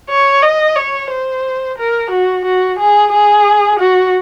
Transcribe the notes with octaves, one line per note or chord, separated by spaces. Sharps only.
C#5
D#5
C#5
C5
A#4
F#4
F#4
G#4
G#4
F#4